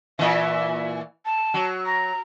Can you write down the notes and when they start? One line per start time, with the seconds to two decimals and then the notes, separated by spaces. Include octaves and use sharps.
0.19 A#2 E3 E5
1.26 A5
1.54 F#3
1.86 A#5